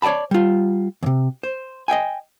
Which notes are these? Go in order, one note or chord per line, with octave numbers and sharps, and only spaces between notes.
C#5 D5 G#5 A5 B5
G3 F4
D#2 C3
C5
D#5 E5 G5 G#5